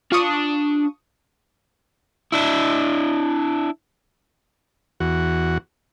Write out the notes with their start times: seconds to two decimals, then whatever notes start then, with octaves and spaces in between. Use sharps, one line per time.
0.12 D4 F4 A5 C#6 D#6
2.32 D4 E4
5.00 E2 F#4